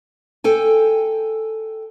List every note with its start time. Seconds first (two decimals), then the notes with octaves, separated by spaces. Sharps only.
0.44 A4 G5 G#5